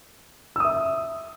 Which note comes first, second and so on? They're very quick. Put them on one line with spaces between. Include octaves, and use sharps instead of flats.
E6 D#6 E5